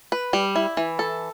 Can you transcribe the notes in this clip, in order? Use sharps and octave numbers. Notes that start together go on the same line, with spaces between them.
B4
G3
E4
E3
A4